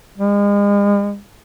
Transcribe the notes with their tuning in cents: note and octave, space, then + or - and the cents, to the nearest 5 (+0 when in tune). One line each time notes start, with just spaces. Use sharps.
G#3 -40